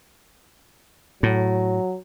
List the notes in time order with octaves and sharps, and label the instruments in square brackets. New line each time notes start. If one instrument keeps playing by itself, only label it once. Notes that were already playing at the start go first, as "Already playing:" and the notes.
[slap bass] A2 [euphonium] F#3